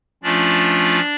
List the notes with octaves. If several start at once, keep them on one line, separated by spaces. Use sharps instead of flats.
F3 A3 C#4 D4 F4 D5